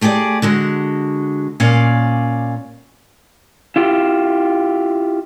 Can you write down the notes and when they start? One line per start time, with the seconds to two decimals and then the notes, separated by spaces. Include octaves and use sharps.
0.01 A3 G4 G#4 C5 D5
0.42 D3 G#3 F#4
1.60 A#2 C#4 D5 F5
3.76 E4 F4 G4